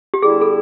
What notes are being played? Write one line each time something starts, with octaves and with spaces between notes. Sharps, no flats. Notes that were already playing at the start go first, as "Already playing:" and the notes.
G4
D3 G3 B3 E4 G#4
A4